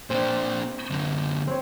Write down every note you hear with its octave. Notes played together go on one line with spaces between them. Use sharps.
A#2 C4 D4
F#2 D3
C4 C#5